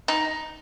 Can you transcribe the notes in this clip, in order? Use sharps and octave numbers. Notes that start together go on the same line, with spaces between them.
D#4